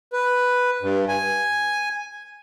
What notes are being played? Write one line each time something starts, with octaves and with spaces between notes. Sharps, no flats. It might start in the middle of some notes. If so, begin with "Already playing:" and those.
B4
G2
G#5